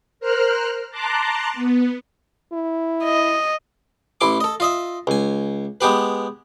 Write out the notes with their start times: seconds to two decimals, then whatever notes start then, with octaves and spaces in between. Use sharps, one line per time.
0.20 A#4 C5 F6 F#6
0.90 A5 A#5 C6 D6 F#6
1.54 B3
2.53 E4
3.04 D#5
4.21 A1 E4 C6 D6
4.40 A4 D#5
4.60 F4 D#5 E5
5.07 C#2 G#5
5.81 G#3 B3 G4 B4